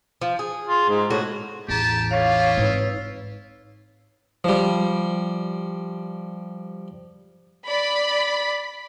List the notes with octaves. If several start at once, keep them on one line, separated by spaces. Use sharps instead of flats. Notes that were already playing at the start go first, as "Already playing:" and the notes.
F3
G#4
F4
G#2
A2 F#4
A1 E2 G4 G#4 A5 A#5
E4 F4 C#5 F5 C#6 D6
G#2 C4 D#4 B4 E6
F3 G3
D5 B5